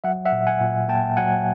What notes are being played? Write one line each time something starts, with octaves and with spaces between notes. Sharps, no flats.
F#3 E5 F#5
E5 F#5
A#2
F#5 G#5
A#2
A#3 G5 A5
F#3 F#5 G#5